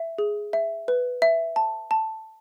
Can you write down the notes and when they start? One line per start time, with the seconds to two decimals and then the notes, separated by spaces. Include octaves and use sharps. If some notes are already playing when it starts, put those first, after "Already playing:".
Already playing: E5
0.19 G#4
0.53 E5
0.88 B4
1.22 E5
1.56 A5
1.91 A5